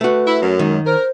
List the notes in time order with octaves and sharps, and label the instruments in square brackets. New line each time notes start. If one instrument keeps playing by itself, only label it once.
[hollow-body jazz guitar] A3 F#4 [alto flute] B4
[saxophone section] E4
F#2
[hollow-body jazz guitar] D#3 [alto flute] G#3
[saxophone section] A#4 [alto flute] C5